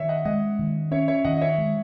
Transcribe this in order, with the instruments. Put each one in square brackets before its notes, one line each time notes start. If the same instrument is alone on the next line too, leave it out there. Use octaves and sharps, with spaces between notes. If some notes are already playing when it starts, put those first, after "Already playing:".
Already playing: [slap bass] D#3 [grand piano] C#5 E5
[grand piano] D#5 F#5
[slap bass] G#3 [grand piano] D#5 F#5
[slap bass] D#3
[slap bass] C#4 [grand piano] C#5 E5
[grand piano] C#5 E5
[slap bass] D#3 [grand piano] D#5 F#5
[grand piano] D#5
C#5 E5
[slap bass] G#3